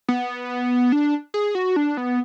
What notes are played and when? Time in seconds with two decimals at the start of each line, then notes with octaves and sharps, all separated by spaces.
0.08 B3
0.92 D4
1.34 G#4
1.55 F#4
1.76 D4
1.97 B3